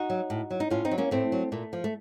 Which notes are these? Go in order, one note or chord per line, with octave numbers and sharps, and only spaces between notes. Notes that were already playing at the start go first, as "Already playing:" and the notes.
Already playing: D#4 F#4
F#3
A2
F#3
D#4
A2 C#4 F4
C4 D#4
F#3
A#3 C#4
A2 A3 C4
F#3
A#2 A3
F3
A3